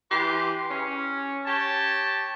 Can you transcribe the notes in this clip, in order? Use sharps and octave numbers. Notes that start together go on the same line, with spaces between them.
E3 G4 B4 C6
C#4
G4 C#5 A5